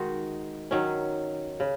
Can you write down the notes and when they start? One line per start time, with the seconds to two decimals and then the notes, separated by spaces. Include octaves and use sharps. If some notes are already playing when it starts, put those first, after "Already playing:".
Already playing: D#3 G#3 D#4 F#4
0.71 D#3 F#3 C#4
1.60 C#3